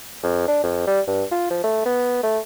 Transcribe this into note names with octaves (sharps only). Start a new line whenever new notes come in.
F2
D4
F2
G3
G2
F4
F3
A3
B3
A3